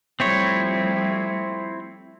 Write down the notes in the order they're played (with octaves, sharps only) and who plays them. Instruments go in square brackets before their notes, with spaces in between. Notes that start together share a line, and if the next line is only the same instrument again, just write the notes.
[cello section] F3 G3 A3 [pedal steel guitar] C4 E4 C#5